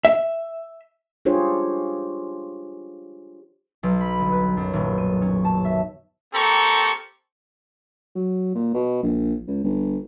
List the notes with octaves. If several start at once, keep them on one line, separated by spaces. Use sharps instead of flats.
E5
D4 F4 G4 G#4 C5 C#5
B1
B5
G1
B4
F#2
D#1
D#7
C#4
A5
E5
A#3 C4 G4 A4 A#5 C#6
F#3
A#2
B2
A#1
C#2
G1